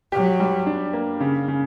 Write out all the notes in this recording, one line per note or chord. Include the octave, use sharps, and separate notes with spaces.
F#3 G4
G3
D4
A#3
C#3
C#3